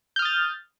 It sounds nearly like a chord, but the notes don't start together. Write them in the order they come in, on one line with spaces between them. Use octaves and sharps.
G6 F6 D#6 A6